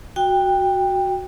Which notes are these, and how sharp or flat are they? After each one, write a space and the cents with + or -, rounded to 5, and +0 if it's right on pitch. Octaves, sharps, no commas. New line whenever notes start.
F#4 +0 G5 +15